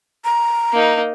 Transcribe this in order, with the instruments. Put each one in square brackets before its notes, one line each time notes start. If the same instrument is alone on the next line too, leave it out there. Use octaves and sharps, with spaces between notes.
[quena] A#5
[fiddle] A#3 D#4